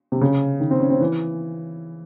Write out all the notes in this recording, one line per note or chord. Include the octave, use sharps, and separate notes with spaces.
C3
C#3
D#3
C4
C#4
C4
E3